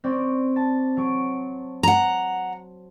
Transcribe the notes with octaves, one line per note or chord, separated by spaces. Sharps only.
C4 D5 C#6
A5
F#3 C#6 D7
F#5 A#5